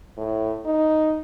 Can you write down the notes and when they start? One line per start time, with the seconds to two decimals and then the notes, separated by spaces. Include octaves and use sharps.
0.17 A2
0.66 D#4